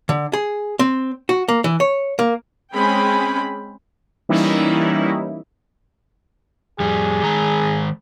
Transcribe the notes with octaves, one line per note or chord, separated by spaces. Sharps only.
D3
G#4
C4
F#4
A#3
E3
C#5
A#3
G#3 C4 C#4 G#4 G5 B5
E3 G3 A#3 C#4 D#4 E4
F2 G3 G#4
D#3 G#3 A#5